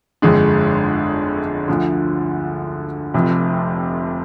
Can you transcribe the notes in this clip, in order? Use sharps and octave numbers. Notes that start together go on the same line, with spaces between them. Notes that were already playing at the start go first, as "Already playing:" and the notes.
G1 F2 D3 G#3 D4
D2 D3 F3
F1 F2 C3